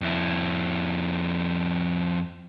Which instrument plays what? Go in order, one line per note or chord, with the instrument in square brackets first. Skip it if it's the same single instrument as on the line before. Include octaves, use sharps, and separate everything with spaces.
[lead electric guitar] F2 E4